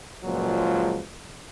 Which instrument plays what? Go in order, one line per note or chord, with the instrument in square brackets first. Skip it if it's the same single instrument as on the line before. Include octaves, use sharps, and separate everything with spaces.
[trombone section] C#2 A#2 F3 F#3 G#3